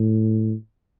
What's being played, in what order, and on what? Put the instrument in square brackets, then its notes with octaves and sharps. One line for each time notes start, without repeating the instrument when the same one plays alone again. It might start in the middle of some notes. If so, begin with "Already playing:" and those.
Already playing: [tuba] A2